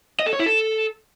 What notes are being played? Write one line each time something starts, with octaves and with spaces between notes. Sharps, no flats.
D#5
A4
C#5
E4
A4